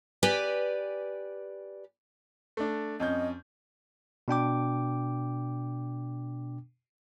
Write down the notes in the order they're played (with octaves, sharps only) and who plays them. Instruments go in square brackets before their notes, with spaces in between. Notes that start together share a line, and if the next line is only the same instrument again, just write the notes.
[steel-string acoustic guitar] G4 B4 D5 G#5
[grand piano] A3 D4
[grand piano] F2 C#4 G6 [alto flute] D#5
[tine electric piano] B2 D4 G5 D6